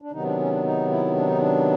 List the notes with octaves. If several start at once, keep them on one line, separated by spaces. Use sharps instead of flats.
D4
C3 D#3 F#3 B3 D#4
D4
C#4
D4
D#4
E4
D4
D#4
D4